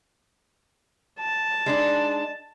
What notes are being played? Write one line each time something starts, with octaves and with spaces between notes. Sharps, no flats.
A5
G#3 D4 D#4